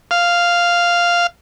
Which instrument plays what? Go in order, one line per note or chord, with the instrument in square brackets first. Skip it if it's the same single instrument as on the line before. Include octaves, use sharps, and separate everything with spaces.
[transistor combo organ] F5